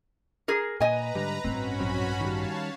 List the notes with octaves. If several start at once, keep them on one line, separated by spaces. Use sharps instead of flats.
G#4 A#4
A#2 B4 D#5 G#5 A#5
G#2 D3 G3
A1 G2 C4 C#4 F#4 B5
A#1 F#3 C4
D#3 G3 C#5 F5 A5